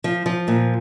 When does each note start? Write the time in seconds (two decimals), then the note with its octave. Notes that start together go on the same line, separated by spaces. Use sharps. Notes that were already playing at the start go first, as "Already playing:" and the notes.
0.04 F3
0.26 F3
0.48 A#2